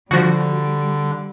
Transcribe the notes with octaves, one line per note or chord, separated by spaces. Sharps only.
D3 F3 G3 F#4